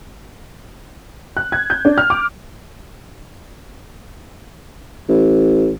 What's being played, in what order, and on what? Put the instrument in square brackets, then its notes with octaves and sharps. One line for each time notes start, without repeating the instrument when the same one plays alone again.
[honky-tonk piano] F#6
G#6
G6
D4
F6
D6
[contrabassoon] A1